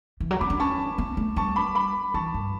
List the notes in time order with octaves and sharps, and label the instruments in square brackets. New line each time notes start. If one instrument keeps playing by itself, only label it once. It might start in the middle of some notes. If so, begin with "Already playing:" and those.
[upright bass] E3
F#3
[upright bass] C#4 [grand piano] B5 D6
[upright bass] D4
[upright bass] C#4 [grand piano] A5 C#6
[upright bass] B3
A3
[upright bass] G3 [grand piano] A5 C#6
[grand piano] B5 D6
B5 D6
[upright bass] E3 [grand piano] A5 C#6
[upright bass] G2